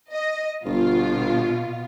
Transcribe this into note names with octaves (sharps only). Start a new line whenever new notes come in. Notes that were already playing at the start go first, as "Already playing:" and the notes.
D#5
G1 B2 F4